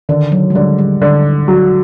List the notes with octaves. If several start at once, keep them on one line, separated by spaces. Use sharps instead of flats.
D3 D#3
F#3
G#3
D3 G3
G3
D3
F#3